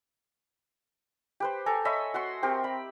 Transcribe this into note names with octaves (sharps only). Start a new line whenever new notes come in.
G4 B4 C5
A4 G#5 A#5
C#5 D#5 E5 B5
F#4 F#5 C6
C4 G4 A#4
B5